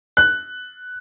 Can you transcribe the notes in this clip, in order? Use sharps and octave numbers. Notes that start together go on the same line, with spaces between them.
F#6